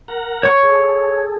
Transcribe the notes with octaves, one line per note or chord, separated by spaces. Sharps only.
A#4 F#5 A#5
C#5 C#6
G#4 A4